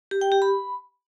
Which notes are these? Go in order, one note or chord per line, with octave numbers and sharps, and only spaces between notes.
G4
G5
G4
B5